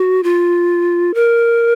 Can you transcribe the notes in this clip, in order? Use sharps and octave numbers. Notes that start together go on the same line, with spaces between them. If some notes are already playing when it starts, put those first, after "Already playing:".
Already playing: F#4
F4
A#4